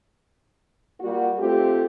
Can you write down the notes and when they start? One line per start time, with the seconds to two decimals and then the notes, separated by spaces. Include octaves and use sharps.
1.00 G3 A#3 F4 F#4
1.38 A3 C4 F4 G4